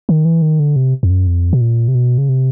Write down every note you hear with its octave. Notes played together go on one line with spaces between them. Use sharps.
D#3
E3
D#3
D3
C3
F2
F#2
F2
B2
A#2
C3
B2
C#3
C3